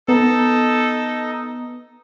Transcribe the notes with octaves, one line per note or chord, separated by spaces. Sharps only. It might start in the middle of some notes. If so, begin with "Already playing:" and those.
B3 D#4 A4 D#5